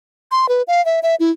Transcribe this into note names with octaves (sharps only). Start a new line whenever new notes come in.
C6
B4
F5
E5
E5
E4